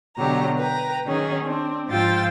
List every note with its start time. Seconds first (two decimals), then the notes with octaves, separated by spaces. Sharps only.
0.17 B2 D3 F#3 G4 A#5
0.57 B4 G5 A#5
1.05 D#3 F#3 C#4 G#4
1.44 C4 D4
1.88 G#2 F3 F4 G5 E6 A6